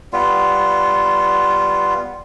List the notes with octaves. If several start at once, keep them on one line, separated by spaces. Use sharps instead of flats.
G3 B3 F4